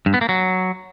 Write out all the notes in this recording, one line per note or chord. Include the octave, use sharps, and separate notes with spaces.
G2
B3
A#3
F#3